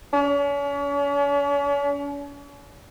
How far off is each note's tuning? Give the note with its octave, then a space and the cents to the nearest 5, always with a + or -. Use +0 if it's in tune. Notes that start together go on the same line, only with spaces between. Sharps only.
C#4 +40